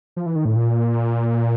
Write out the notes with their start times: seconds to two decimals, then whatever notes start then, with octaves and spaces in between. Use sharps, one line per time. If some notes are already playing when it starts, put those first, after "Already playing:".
0.16 F3
0.26 E3
0.36 D#3
0.45 A2
0.56 A#2